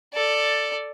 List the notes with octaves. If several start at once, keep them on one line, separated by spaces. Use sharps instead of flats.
A4 D5